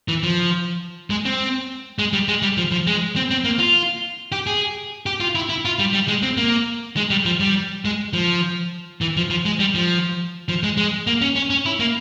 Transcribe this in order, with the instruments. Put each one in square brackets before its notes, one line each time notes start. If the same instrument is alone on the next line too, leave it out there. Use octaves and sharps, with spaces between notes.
[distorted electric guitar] E3
F3
G#3
C4
G#3
G3
G#3
G3
F3
F3
G#3
C4
C4
A#3
F4
G4
G#4
G4
F4
E4
E4
F4
G3
G3
G#3
C4
A#3
G#3
G3
F3
G3
G#3
F3
E3
F3
F3
G#3
G3
F3
F3
G#3
G#3
A#3
C#4
C#4
C#4
E4
A#3